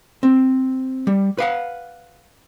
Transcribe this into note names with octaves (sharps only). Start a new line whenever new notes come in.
C4
G3
B4 F5 F#5